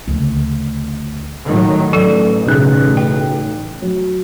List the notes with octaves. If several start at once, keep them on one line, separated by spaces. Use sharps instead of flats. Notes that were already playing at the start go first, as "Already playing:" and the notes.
D2 C#3
A2 D#3 F#3
A1 F#3 A4
B1 C#3 F#6
G5
F#3